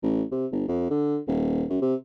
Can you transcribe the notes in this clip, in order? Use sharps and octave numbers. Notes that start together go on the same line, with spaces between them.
A1
C3
G1
F2
D3
D#1
F#2
C3